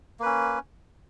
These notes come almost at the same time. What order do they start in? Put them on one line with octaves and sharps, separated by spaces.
A#3 B4 C#4